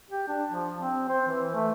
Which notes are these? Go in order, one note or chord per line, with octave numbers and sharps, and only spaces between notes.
G4
D4
F3
C4
C5
E3
A3